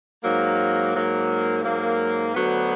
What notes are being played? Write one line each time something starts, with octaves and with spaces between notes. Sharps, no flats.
G#2 F#3 A#3
G#2 F#3 A#3
G#2 F#3 A#3
D2 D3 F#3 B3